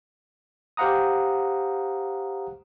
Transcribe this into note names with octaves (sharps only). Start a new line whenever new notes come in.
G4 C5 F5 F#5 A#5 D#6